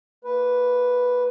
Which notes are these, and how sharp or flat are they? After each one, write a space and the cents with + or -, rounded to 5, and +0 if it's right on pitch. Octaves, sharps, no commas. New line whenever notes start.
A#3 -25 B4 +0